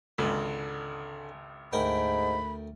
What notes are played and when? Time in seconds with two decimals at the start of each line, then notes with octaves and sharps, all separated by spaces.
0.18 G#1 C#2 D3
1.73 D2 G#2 A#4 G5 B5